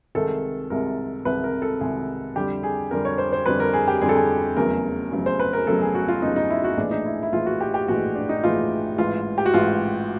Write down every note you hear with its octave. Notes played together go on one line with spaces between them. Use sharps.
C2 C3 D#3 G#3 A4
C2 C3 D#3 G#3 A#4
C2 C3 D#3 G#3 B4
A#4
A4
C2 C3 D#3 G#3 G#4
F2 D3 G3 G4
G#4
F2 D3 G3 A#4
C#5
C5
C5
F2 D3 G3 B4
A#4
G#4
G4
F2 D3 G3 G#4
A4
G#4
F1 E2 C#3 F#3 A#4
F1 E2 C#3 F#3
C5
B4
A#4
F1 E2 C#3 F#3 A4
G#4
F#4
F4
F1 E2 C#3 F#3 D#4
D#4
E4
F#4
A#1 A2 E3 G#3 D4
D#4
E4
E4
A#1 A2 E3 G#3 F4
F#4
G4
G4
A#1 A2 E3 G#3 F#4
D4
D#4
A#1 A2 E3 G#3 F4
A1 G#2 E3 F4
G4
F#4
A1 G#2 E3 F4